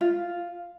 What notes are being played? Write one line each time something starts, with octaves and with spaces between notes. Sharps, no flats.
F4